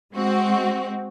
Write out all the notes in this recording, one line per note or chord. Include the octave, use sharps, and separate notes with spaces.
G#3 C4 F#4